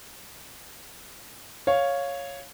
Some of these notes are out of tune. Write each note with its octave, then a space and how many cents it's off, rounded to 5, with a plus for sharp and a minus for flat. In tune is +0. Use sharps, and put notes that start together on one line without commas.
C#5 +0 F5 +0